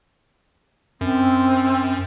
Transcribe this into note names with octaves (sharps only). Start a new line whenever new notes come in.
F#2 C4